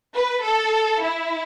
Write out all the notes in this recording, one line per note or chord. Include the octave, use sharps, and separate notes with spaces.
B4
A4
E4